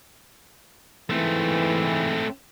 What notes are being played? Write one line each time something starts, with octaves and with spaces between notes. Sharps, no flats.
G#2 E3 A3 C4